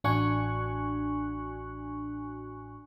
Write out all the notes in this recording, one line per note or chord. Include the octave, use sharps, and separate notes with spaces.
A1 D4 F#4 G#5 C#6 F#6